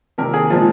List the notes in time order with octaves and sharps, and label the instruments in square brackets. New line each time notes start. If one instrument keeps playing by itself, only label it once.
[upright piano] C3 D#3 A#3 A#4
G#4
A#2 F3 G#3 C4 F4